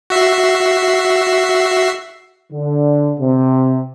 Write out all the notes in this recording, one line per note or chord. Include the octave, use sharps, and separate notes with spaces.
F#4 E5 C7
D3
C3